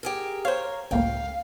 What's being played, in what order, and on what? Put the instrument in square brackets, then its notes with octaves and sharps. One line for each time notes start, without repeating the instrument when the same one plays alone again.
[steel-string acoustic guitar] G4 G#4 A#4
[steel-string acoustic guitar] A#4 C#5 [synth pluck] C5 F5
[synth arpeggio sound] G1 A2 A#3 [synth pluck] C#2 [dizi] F5 [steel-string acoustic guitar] G5